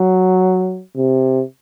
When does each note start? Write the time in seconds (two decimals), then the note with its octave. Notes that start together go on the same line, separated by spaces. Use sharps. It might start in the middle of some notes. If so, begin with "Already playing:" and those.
Already playing: F#3
0.96 C3